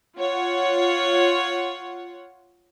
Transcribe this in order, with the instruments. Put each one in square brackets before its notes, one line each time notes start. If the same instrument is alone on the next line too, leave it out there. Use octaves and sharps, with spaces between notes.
[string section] F4 C#5 F#5